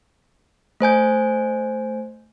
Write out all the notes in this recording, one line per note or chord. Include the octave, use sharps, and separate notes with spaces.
A3 C5 G#5 G6